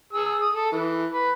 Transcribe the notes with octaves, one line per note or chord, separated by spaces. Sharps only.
G#4 E6
D#6
A4
E3
B4